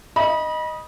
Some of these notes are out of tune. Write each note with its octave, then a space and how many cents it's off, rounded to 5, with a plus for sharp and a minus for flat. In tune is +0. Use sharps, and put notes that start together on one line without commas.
D#5 +0 B5 -30